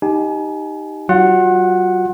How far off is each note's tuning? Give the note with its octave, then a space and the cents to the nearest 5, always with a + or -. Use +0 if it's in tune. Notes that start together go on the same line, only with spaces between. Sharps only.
D#4 +0 G4 +0 G#5 +35
F#3 +40 F4 +40 F#5 +0